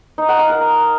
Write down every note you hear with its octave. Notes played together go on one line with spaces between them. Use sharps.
D#4
F#5
F5
A#4